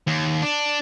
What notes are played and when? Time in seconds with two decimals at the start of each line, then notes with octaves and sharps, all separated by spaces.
0.07 D#2
0.42 D4